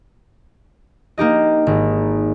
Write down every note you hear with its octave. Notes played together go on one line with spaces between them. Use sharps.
A#3 D#4 G4 D#5
G#1